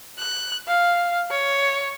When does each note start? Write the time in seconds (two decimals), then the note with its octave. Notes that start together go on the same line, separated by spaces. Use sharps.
0.18 F#6
0.68 F5
1.31 C#5